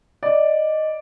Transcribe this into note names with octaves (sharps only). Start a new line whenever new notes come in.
D5 D#5